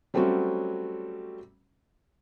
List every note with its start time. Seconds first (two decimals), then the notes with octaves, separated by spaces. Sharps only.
0.14 F#3 G3 A3 C4 C#4 F#4